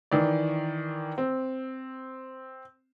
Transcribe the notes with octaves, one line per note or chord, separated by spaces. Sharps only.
D#3 E3 D5
C4